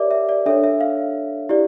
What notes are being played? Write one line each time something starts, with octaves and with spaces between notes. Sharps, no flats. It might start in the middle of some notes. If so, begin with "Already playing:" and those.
Already playing: G4 A#4 C#5 D5 E5 D6
E5
D5
D4 A4 C#5 E5
E5
F5
E4 G4 D5